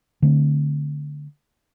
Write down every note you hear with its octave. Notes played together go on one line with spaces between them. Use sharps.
D3 A3 C4